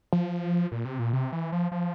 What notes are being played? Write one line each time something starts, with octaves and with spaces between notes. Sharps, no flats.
F3
A#2
C3
A#2
C3
E3
F3
F3